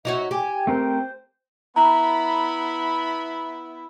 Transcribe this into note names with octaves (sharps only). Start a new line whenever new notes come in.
D#4 F#4 C#5 E5
G4 G#5
A3 C4 A#4 C5
B3 E4 A#5 B5